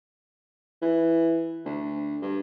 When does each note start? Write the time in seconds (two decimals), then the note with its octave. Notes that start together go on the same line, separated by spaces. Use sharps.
0.82 E3
1.65 D2
2.22 G2